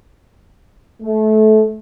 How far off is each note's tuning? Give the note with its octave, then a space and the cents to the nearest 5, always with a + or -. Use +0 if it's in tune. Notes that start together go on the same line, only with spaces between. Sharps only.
A3 -25